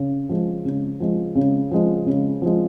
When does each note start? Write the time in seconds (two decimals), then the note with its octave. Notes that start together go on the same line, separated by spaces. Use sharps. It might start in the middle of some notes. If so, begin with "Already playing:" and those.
Already playing: C#3
0.29 F3 G#3
0.65 C#3
1.00 F3 G#3
1.35 C#3
1.71 F3 G#3
2.06 C#3
2.42 F3 G#3